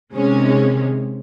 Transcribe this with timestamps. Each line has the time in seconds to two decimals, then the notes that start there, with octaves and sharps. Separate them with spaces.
0.15 C3 D#3 G#3 C#4